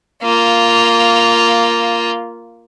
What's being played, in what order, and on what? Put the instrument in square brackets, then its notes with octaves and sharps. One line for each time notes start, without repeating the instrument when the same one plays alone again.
[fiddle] A#3 F4